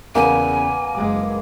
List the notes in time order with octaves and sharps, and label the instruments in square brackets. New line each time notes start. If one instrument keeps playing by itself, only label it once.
[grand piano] E2 C#3 [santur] A#3 B3 [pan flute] G#5
[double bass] F#1 G#3 [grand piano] D6